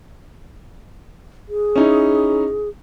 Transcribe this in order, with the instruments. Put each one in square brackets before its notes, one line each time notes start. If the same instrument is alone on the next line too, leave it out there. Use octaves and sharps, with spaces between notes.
[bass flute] G#4
[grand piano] C#4 D#4 E4